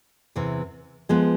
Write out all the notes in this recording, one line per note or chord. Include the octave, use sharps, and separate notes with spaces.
E2 C3 E3
F3 G#3 B3